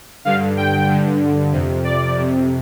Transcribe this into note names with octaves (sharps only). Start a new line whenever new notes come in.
G2 D3 F5
G5
G2 D3
F2 C3
D5
F2 C3